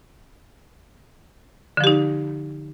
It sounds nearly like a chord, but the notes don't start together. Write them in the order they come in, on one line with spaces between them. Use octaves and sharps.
D3 F3 G4 D#4